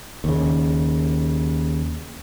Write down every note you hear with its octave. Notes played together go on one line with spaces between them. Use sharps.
D#2 C#3